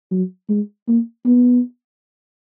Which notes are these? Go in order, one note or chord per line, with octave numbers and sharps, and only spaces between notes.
F#3
G#3
A#3
B3